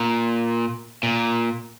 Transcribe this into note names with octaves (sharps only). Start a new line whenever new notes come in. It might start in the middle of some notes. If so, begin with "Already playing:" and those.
Already playing: A#2
A#2